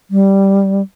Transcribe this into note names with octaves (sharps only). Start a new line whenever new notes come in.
G3